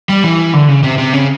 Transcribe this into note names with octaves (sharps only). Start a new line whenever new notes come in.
G3
E3
D3
C#3
C3
C3
C#3